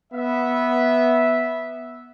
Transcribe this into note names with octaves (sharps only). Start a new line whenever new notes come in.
B3 E5